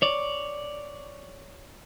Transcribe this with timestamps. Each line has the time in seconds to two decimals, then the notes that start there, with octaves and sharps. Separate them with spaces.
0.02 C#5 D5